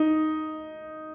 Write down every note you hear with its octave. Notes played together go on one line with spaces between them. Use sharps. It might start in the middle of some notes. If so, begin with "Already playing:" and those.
Already playing: D#4